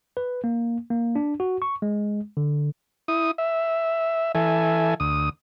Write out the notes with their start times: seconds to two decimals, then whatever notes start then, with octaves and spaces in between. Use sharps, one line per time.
0.17 B4
0.44 A#3
0.90 A#3
1.16 D4
1.40 F#4
1.62 C#6
1.82 G#3
2.37 D3
3.08 E4 D#6
3.38 E5
4.35 E3 A4 E5 G#5
5.00 D2 D#6